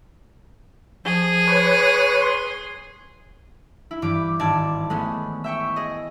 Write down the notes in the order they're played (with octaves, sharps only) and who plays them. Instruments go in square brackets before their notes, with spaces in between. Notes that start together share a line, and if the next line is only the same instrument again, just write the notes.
[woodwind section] F3 [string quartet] G#4
[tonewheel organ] B4 C#5
[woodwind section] C6
[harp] E4
G2 E3 G4 D6
G#1 D#3 D5 A5 G#6
G#3 A3 B3 C#4
E5 G5 C#6
G#4 D#5